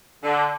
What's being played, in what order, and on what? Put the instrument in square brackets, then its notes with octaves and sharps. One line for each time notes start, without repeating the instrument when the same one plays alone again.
[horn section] D3